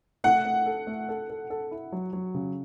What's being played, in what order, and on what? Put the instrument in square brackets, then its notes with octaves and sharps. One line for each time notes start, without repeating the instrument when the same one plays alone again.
[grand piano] A3 [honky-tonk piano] F#5
[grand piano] A3
A4
A3
A4
A4
A4
E4
F#3
F#3
C#3